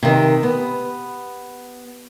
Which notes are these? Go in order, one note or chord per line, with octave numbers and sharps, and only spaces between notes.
C3 D#3
B3